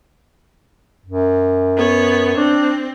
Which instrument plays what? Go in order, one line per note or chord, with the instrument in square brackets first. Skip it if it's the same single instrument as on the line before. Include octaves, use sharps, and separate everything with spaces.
[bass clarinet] F#2
[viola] B3 C#5
[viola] C4 [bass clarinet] D4